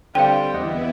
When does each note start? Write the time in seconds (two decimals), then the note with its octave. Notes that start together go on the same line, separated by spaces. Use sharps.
0.15 D3 G3 C4 C5 F5 G5
0.54 E2 B3 E4 D#5 F#5